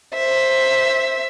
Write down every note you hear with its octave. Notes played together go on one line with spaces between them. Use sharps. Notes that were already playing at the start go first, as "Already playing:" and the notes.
C5 E5